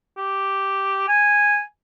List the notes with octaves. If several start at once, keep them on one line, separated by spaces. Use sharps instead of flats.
G4
G#5